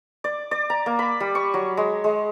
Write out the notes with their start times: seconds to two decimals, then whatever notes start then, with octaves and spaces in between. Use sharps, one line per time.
0.24 D5
0.51 D5
0.70 A#5
0.86 A#3
0.99 B5
1.20 G3
1.35 C#6
1.54 F#3
1.77 G#3
2.04 G#3